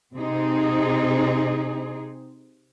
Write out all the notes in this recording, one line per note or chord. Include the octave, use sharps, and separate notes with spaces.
C3 C4 D#4 G#4